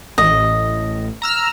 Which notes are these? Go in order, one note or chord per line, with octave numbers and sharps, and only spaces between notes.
A1 D#5
A#5 E6 F6